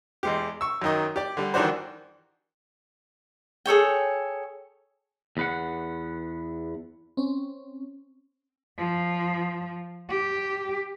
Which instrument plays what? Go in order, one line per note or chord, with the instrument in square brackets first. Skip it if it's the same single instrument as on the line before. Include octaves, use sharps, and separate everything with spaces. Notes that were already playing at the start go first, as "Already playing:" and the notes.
[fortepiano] E2 G#3 G4
C#6 E6
F#2 D#3 D#5
G4 D5
D3 G3
D#3 E3 G3 D4 F#4 C5
[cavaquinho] G#4 A4 C#5 G5
[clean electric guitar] E2 B4 F#5
[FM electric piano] C4 C#4
[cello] F3
G4